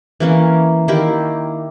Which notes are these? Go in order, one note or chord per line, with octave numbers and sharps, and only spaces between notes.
E3 A#3 C#4
D#3 A#3 E4 G4